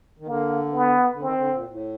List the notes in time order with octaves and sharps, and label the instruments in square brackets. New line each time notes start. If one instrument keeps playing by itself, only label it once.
[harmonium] D#3
[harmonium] D3 [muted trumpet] A#3
[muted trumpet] B3
[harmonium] D3
[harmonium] D#3 [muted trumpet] C4
[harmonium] D3
A#2
A2